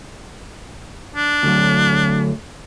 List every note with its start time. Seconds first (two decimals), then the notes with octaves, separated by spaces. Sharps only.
1.15 D4
1.43 D2 F#3